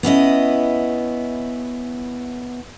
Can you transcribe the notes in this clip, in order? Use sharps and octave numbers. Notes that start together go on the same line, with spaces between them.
B3 C#4 E4 D#5